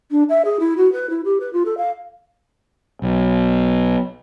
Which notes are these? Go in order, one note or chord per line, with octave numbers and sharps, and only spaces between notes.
D4
E5
G#4
E4
F#4
B4
E4
G4
B4
F4
A4
F5
B1